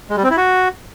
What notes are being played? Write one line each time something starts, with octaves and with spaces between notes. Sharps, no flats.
G#3
G3
C4
E4
F#4